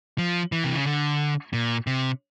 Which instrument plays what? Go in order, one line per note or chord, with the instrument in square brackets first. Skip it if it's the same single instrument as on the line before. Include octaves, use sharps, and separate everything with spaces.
[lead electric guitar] F3
E3
C3
C#3
D3
A#2
C3